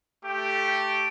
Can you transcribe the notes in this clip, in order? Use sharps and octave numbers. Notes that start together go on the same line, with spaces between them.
A3 G4